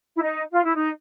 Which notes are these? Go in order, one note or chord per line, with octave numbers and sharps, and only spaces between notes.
E4
D#4
F4
E4
D#4